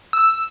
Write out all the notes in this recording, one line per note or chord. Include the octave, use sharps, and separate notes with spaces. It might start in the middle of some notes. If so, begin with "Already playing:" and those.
E6